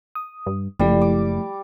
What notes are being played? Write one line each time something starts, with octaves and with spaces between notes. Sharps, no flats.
D#6
G2
F#1 F3 G3 A3 E4
D6